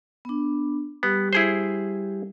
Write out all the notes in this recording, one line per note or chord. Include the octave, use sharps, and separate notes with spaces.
B3 D4
G3 B3 G4
E4 G#4 C5